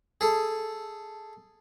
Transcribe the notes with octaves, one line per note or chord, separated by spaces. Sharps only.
G#4 A4